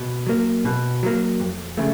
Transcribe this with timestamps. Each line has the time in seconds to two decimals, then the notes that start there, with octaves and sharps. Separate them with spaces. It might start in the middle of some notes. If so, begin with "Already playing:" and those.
Already playing: B2
0.27 F#3 A#3
0.65 B2
1.03 F#3 A#3
1.40 F2
1.78 C#3 F3 A3